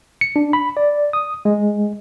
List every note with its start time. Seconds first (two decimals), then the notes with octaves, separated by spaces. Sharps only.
0.21 C#7
0.36 D4
0.53 B5
0.77 D5
1.13 D#6
1.45 G#3